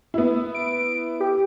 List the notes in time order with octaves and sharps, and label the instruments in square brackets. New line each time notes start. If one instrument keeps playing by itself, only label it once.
[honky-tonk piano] B3 E4
[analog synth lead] D7
G4